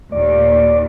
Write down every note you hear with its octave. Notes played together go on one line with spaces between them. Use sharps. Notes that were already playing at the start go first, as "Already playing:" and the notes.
D#2 A#2 D5